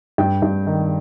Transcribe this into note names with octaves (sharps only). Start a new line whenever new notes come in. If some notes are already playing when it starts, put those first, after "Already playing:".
G2 G5
G2
D#3